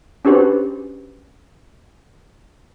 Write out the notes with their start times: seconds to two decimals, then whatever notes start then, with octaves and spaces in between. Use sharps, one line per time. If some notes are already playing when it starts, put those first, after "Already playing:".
0.25 C#4 D4 F#4 G4 B4 C5